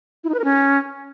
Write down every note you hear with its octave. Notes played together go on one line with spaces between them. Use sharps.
E4
D#4
B4
A#4
C#4